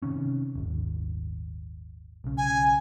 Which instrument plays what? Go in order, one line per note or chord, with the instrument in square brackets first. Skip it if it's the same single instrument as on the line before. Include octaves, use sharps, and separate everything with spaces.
[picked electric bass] C3 D#3 C#4
D#1 G#1
B1 C#3
[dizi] G#5